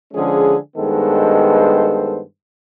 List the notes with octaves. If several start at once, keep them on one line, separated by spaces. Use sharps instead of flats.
D3 F3 G#3 C#4 G#4
G2 D#3 G#3 B3 A4 C5